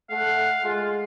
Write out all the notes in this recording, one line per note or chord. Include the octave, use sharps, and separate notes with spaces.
A3 F5 F#5
G#3 F4